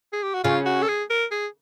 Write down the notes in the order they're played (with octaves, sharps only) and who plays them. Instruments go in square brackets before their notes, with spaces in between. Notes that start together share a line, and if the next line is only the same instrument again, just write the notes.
[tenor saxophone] G#4
G4
F#4
[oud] C#3 [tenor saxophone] F4
[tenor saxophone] F#4
A4
G#4
A#4
G#4